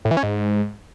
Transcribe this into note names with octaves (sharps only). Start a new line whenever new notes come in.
A2
E3
C#4
G#2